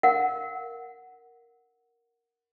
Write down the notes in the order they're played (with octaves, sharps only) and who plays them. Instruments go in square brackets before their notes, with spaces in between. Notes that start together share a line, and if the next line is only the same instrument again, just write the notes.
[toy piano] A#4 F5 F#5